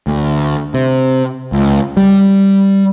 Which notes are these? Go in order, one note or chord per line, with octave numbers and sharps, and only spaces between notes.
D2
C3
C#2
G3